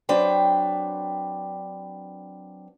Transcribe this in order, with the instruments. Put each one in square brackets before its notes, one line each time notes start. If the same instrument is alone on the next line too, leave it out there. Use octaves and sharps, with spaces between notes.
[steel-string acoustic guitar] F#3 C4 D4 B4 G5